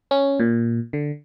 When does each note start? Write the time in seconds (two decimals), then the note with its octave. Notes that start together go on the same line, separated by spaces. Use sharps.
0.11 C#4
0.40 A#2
0.93 D3